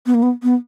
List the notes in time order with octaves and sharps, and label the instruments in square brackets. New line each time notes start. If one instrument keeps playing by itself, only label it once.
[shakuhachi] B3
A#3
B3
B3